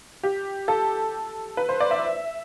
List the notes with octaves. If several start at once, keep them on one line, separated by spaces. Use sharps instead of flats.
G4
A4
B4
C5
D5
E5